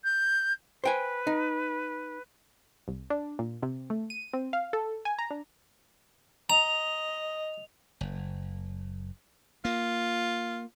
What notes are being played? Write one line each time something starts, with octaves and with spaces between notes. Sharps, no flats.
G6
B4 C5 G5 G#5
D#4
C2
D4
A#2
C3
A3
D#7
C4
F5
A4
G#5
A#5
D4
D#5 A#5 F7
F#1
A#3 F4